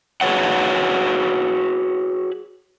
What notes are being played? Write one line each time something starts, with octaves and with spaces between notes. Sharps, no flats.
F#4 G#4 A4 B4 C#5 F#5